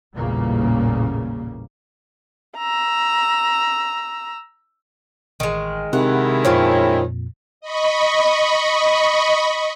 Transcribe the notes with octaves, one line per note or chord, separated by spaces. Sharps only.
A1 E2 A#2 C#3 G3 A#3
A#5 E6
A1 D#3 G#3
C3 D#3 G#3 E4 F#5
F2 A#2 C#4 F4 G4 C5 C#5 A5
D#5 B5 C#6